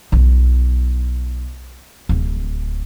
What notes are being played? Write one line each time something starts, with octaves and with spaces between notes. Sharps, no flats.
B1 E4
D1